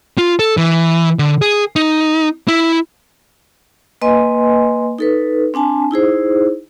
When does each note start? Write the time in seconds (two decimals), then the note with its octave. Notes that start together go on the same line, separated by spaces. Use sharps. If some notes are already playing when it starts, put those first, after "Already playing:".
0.18 F4
0.39 A4
0.57 E3
1.19 D3
1.42 G#4
1.76 D#4
2.48 E4
4.01 A#3 B4 D#5 G#5 C6
4.98 D#4 A4 B4
5.54 C4 D4 G#5 A5
5.91 D#4 E4 G#4 C5